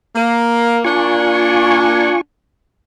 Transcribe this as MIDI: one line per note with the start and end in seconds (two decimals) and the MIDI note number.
0.15 0.79 58
0.84 2.13 58
0.84 2.13 62
0.84 2.21 65
0.84 2.21 80
0.84 2.21 85